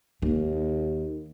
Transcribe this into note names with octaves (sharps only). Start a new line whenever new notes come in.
D#2 A#3